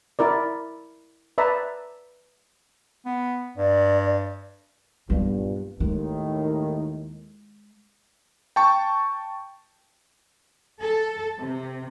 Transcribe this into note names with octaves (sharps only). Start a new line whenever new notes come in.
E4 A#4 D5
B4 D5 E5 A5 A#5
B3
G2 D5
G2 A#2 G3 B3
D#2 A2 D#3 G#3
G5 A5 C#6
A4
C3